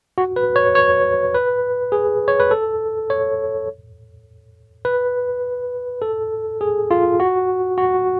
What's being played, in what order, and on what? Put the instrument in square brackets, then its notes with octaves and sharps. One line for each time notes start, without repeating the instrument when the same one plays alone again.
[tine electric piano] F#4
B4
C#5
C#5
B4
G#4
C#5
B4
A4
C#5
B4
A4
G#4
F4
F#4
F#4